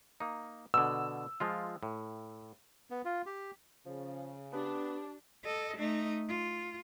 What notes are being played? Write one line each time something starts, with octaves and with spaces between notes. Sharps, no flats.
A#3 D#4
B2 D3 E6
F3 G#3 F4
A2
B3
F4
G4
C#3 F3
B3 D4 G4
A4 D#5
A3 D#4
F4